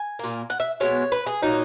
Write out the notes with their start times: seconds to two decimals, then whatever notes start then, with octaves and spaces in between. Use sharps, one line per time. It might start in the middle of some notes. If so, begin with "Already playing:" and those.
Already playing: G#5
0.19 A#2 A#3
0.50 F#5
0.60 E5
0.80 B2 G#3 B3 C#5
1.12 B4
1.26 G#4
1.43 A#2 F#3 A#3 D#4